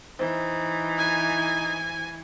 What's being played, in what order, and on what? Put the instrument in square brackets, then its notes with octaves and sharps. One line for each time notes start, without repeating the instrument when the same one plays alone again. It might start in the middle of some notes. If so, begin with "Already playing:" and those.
[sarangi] E3 [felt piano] C4 [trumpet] D#4
[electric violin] G#5